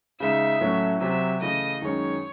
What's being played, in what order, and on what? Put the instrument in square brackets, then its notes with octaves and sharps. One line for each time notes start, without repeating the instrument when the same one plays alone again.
[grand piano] C#3 G#3 D#4 [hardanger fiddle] E5
[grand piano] A2 F#3 A3 C#4
[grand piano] C3 F#3 C4 [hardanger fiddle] E5
[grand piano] C#3 E3 A3 [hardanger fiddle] D#5
[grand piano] F#2 D#3 G#3 C#4 [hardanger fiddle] C#5